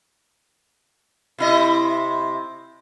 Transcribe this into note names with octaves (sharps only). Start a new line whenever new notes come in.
C3 E4 D#5